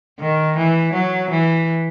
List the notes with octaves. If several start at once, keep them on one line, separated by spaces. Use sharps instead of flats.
D#3
E3
F#3
E3